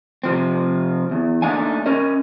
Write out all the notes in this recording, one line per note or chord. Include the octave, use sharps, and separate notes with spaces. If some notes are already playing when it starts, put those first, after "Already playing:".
C3 F3 C4
E2
A3 A#3 D4 D#4 F5 G#5
C#4 A#4 D#5